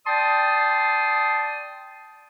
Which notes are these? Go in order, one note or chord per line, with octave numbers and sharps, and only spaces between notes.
D5 G5 A5 C6 D#6